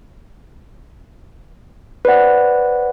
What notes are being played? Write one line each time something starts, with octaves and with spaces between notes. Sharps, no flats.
B4 C5 D5 F#5